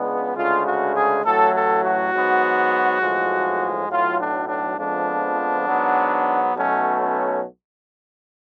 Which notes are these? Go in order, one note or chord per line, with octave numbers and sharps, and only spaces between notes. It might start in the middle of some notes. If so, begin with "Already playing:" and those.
Already playing: C#2 C#3 G#3 B3 D4
D2 C#3 G#3 F4
F#4
G#4
A1 A2 F#3 A3 A4
A4
F#4
G#2 F#3 B3
B1 A2 F3 G#3
B1 A2 F#3 F4
D4
D4
F2 F3 G#3 B3 D4
G#2 F#3 B3
B1 B2 F#3 A3 C#4
C#4